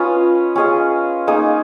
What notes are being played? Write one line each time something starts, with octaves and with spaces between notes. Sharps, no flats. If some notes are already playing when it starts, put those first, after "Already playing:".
Already playing: C#4 F4 B4 D#5
C#4 G#4 D#5
A#3 D#4 G#4 D#5